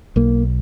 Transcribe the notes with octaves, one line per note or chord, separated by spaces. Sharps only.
B1 A#3